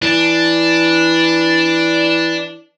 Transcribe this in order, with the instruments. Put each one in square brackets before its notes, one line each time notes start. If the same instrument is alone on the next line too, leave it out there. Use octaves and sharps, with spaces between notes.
[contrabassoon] E3 [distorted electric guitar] D4